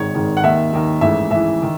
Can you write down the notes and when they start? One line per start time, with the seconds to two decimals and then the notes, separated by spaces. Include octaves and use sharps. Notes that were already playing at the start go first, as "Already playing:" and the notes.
Already playing: G#1 G#2 D#3 C#5
0.15 G#1 G#2 D#3
0.37 F#5
0.43 D#2 D#3 E5
0.73 D#2 D#3
1.01 A1 G#2 E3 E5
1.31 A1 G#2 E3 E5
1.62 D#3